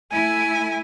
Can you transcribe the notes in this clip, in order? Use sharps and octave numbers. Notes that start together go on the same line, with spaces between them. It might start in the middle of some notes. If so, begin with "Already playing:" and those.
A3 E4 G#5